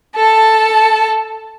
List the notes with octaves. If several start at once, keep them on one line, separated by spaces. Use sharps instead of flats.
A4 A5